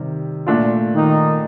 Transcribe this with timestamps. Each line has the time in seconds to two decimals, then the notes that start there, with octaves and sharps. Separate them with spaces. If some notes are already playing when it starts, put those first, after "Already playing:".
Already playing: C3 D#3 G3
0.47 A#2 A3 D4 F4
0.93 D#3 D#4